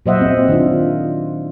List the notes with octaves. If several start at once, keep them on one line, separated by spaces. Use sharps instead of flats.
A#2 F#3 C5 D#5 E5 F#5
C4
D#3 D4 F4